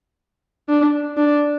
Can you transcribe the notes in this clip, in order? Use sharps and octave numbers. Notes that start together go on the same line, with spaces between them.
D4
D4